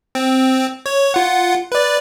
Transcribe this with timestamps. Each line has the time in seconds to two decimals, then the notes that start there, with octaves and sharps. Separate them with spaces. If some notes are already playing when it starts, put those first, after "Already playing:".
0.15 C4
0.86 C#5
1.14 F4 F#5
1.72 B4 D5